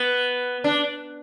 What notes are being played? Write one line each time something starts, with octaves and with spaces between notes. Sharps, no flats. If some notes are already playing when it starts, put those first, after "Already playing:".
Already playing: B3
D4